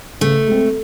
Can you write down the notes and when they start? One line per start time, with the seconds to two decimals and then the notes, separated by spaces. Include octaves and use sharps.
0.21 C#3 A3
0.47 G#3 C4